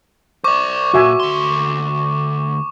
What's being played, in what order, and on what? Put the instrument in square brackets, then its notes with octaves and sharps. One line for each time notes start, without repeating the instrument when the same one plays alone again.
[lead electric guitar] C5 D5 [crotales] C#6 D6
[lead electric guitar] C2 A#2 [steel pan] F#4 E5 G#5
[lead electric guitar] D2 C6